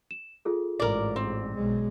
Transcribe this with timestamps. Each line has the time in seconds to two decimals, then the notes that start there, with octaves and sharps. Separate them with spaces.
0.11 E7
0.45 F4 G#4 A4
0.80 A1 G#2 A#4 D5
1.16 C4
1.55 B1 G#3